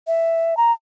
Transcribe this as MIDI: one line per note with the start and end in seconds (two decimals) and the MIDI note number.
0.07 0.57 76
0.57 0.72 82